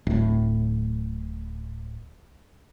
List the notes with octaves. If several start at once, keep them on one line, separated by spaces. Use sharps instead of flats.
D1 A2